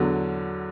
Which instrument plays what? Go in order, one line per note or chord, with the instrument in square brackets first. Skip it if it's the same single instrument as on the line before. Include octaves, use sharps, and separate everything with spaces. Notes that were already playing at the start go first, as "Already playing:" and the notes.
Already playing: [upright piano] E2 D3 F#3